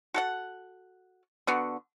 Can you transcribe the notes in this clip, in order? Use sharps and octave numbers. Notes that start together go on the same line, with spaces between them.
F#4 A4 F#5
D3 B3 F#4